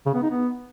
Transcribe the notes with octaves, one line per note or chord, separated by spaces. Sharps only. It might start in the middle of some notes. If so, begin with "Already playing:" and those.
C#3
B3
D#4
B3